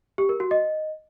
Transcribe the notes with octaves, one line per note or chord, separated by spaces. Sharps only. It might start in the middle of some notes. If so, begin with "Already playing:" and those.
G4
A#4
F#4
D#5